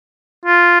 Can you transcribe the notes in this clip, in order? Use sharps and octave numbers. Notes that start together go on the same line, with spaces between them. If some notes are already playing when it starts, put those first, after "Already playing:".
F4